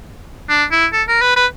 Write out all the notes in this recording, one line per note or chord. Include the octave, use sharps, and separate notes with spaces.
D4
E4
A4
A#4
B4
B4